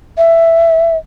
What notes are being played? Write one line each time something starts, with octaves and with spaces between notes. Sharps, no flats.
E5